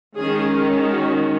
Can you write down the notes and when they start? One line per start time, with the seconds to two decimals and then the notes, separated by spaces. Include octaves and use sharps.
0.17 D#3 G#3 C#4 G#4
0.93 F#4